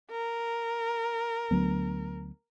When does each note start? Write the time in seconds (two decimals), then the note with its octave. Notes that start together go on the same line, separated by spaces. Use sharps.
0.10 A#4
1.51 D2 F#3 B3